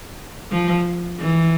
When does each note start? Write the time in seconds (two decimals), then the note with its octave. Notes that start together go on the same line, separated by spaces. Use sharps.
0.52 F3
1.20 E3